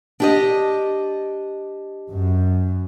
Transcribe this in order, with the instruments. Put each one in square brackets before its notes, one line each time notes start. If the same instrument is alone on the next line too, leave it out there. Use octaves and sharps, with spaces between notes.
[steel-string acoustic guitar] D4 G4 D#5
[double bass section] F#2